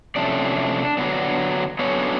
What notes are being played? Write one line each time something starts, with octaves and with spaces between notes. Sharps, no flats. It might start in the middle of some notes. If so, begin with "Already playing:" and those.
C3 F3 A3 C#4 D4 D5
D3 F#3 B3 D4
D3 F#3 B3 C#4 D4 C#5